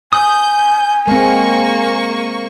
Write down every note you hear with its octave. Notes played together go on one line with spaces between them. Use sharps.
G#5 D#6 G6
G#3 A#3 C4 C#6